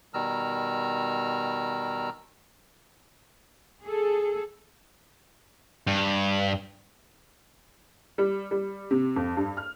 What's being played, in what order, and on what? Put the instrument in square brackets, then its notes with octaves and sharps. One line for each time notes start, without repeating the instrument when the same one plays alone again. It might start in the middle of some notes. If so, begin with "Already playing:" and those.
[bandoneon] B2 D#3 G3 A#5 E6 F6
[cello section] G#4 A4
[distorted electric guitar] G2
[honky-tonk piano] G3
G3
C3
F2
G2
F6